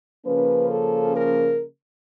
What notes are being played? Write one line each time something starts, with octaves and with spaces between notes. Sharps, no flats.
C#3 F3 A#3 C#4 B4
A4
A#4